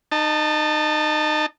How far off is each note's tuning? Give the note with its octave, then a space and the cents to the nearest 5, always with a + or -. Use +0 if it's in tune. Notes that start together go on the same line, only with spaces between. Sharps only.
D#4 -25 A5 +10